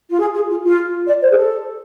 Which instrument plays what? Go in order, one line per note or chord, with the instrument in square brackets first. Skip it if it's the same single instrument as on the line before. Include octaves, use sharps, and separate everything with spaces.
[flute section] F4
G#4
G#4
F4
F4
D5
C5
G#4
A4